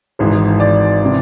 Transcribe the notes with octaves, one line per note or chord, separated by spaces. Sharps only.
G#1 G#2 E3
D5
C3